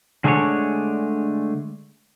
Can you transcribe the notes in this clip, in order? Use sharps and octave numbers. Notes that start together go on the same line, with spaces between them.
D3 G#3 A3 D4 G#4 C#5